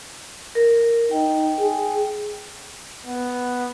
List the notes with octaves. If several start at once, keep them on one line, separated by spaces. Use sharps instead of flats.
A#4
D#4 G5
G#4
B3